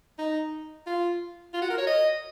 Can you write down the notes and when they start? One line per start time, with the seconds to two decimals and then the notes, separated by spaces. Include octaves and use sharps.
0.19 D#4
0.86 F4
1.53 F4
1.62 F#4
1.70 A#4
1.78 C#5
1.87 D#5